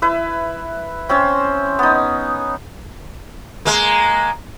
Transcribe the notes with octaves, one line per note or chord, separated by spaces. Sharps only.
E4 B4 E5
C4 C#4 C5 E6
B3 D#4
G#3 A#3